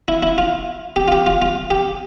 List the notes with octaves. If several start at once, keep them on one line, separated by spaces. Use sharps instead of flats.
E4
E4
F4
G4
F4
G4
F4
F4
G4